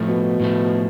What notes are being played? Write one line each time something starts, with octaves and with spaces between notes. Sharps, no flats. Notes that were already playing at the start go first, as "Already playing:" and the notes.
Already playing: A2 F3 A3
B2
A2 F3 A3